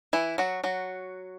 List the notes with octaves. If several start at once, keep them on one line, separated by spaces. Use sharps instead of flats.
E3 E4
F#3 F#4
F#3 F#4